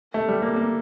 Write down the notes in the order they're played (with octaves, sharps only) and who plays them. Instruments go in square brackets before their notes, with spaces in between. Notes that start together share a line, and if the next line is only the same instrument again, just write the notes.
[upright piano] A3
G3
A#3
A#3